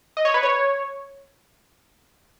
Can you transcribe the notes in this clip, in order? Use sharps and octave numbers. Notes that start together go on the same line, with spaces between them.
D#5
C#5
B4
C#5